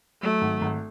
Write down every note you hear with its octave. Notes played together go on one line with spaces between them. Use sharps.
F#3 A3
G#1
G#1